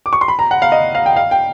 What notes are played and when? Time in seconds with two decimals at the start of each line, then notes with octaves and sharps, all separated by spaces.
0.06 D6
0.13 C#6
0.21 C6
0.28 B5
0.39 A#5
0.51 F#5
0.62 F5
0.72 D#5
0.95 F5
1.06 G5
1.16 F5
1.31 G5